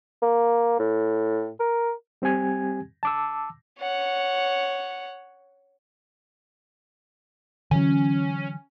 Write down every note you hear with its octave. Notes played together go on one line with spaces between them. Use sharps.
A#3
A2
A#4
G3 C4 G4 G#5 G#6
A5 D6 E6
C#5 F#5
D3 E3 F#3 C#4